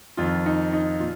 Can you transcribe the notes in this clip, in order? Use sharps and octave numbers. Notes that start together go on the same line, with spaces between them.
F2 D#3 F4
D#4
D#4
A#2 F4